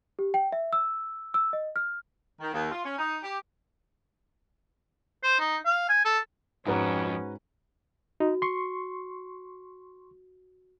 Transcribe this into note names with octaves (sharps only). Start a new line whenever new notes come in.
G4
G5
E5
E6
E6
D#5
F6
D#3
D#2
F4
C#4
D#4
G4
C5
D#4
F5
G#5
A4
F2 G#2 C#4 F#4 B4 A#5
D#4 F#4
C6 C#6